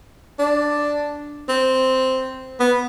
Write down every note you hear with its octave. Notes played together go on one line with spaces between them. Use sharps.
D4
C4
B3